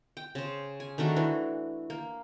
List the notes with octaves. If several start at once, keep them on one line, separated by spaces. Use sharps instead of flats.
G5
C#3 C5
G#5
D#3 A3 D4 F#4
E3
A#3